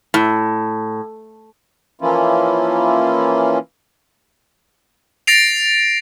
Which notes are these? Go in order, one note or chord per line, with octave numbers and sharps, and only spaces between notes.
A2
E3 F3 A#3 C#4 E4 F4
A6 A#6 C7 D7 F7